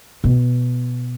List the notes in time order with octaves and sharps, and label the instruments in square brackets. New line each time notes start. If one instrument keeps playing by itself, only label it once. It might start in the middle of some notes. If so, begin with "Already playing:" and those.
[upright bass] B2